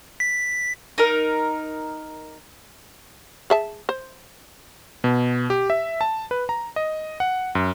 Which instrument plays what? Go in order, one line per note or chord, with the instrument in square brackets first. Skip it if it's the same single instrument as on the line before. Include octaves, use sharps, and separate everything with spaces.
[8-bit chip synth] B6
[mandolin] D#4 A#4
[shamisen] G#4 E5 A5
C5
[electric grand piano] B2
G4
E5
A5
B4
A#5
D#5
F#5
F#2